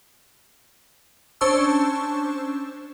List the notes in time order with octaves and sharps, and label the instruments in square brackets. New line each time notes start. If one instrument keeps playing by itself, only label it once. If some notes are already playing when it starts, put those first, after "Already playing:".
[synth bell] C#4 D4 C5 A5 C#6 E6